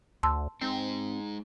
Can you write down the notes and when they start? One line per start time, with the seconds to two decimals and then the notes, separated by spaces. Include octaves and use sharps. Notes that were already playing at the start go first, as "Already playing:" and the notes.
0.23 D2 A5 C6 E6
0.61 G#3 C4 D#4